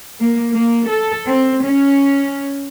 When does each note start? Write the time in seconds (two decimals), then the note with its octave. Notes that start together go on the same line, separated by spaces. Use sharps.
0.19 A#3
0.52 A#3
0.88 A4
1.27 C4
1.65 C#4